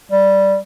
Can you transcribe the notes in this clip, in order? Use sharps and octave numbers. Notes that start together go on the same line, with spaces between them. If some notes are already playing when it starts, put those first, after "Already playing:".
G3